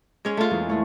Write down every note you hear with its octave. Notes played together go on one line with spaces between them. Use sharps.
G#3 C#4
A3 F4
E2 G#3 A#3
G#3 A3 C#4